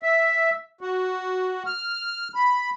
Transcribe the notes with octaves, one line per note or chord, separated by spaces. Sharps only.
E5
F#4
F6
B5